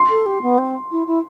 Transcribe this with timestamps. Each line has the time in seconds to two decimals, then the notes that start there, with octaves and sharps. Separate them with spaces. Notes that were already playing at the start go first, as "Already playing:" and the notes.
Already playing: C6
0.10 A4
0.26 G4
0.42 B3
0.58 C4
0.91 E4
1.07 E4